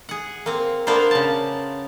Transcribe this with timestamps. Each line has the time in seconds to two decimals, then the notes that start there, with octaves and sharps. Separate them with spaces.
0.09 G#4 F#5
0.46 A#3 C4
0.87 A#3 B3 D4 A#4 C5
1.11 C#3 A5